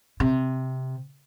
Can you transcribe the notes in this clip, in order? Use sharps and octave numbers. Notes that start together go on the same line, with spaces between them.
C3